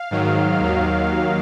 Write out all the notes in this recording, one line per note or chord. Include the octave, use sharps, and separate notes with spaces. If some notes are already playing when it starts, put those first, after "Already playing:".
Already playing: F5
G#2 D#3 F#3
D#2 D#3 F#3